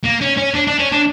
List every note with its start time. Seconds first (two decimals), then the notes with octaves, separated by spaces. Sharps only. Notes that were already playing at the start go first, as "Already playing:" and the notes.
0.05 A#3
0.21 C#4
0.37 C#4
0.54 D4
0.67 D4
0.79 C#4
0.92 D4